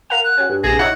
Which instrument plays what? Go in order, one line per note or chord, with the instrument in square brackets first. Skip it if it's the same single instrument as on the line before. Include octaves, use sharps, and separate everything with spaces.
[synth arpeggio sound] A#4 F5 F#5 [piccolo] F7
[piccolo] F#6
[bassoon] C#4 [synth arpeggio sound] F#4 G#5
[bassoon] G2
[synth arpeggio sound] A#1 C3 E7 [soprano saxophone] G#4 [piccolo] A#6
[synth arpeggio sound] D#4 E4 C#5 [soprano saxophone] F#5